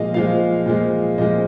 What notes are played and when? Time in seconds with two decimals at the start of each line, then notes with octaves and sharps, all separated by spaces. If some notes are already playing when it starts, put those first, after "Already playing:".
Already playing: A#2 F3 G#3 D#5 F5
0.14 A#2 F3 G#3 F5
0.66 A#2 F3 G#3
1.18 A#2 F3 G#3 D#5